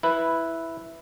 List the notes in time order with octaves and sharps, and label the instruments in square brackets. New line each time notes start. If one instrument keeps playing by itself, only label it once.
[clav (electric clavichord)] E4 B4